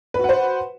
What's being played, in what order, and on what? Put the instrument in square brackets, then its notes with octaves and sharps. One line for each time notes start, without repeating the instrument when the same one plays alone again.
[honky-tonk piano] B4
F#4
F#5
C5